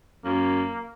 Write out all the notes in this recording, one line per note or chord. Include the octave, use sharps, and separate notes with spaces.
F#2 A#3